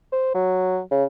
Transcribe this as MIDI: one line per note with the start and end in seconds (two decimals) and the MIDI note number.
0.12 0.32 72
0.34 0.80 54
0.91 1.04 49